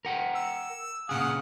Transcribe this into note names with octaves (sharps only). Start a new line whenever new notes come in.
A#4 F#5 G5
E6
A#2 C#3 G#4 F5 F#5 D#6